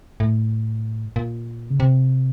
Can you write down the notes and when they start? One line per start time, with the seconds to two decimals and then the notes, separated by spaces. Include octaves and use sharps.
0.20 A2
1.16 A#2
1.70 C#3
1.80 C3